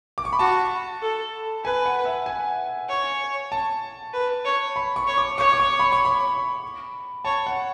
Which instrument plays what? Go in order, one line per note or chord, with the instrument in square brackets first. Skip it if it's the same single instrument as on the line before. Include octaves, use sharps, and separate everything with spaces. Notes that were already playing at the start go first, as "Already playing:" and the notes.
[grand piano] D6
C#6
B5
[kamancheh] F#4 [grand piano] A5
[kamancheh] A4
[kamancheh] B4 [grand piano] G#5
[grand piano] F#5
E5
G#5
[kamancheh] C#5
[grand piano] A5
[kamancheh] B4
C#5
[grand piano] B5
C#6
[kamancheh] C#5
[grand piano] D6
[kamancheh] C#5 [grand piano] C#6
[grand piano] D6
C#6
B5
C#6
B5
[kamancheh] C#5 [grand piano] A5
[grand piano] F#5